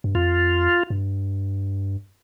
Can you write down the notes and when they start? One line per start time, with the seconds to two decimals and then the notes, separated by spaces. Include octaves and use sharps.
0.04 G2
0.15 F2 F4
0.90 G2